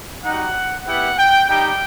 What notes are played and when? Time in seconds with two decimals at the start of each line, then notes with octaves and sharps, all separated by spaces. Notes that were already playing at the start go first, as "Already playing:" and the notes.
0.25 G3 D#4 F#4 F#5
0.87 B3 E4 G4 F#5
1.18 G5
1.49 G3 D#4 G4 G5